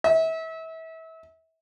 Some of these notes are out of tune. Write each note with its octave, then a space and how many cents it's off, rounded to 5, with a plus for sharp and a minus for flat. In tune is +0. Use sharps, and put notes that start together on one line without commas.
E5 -30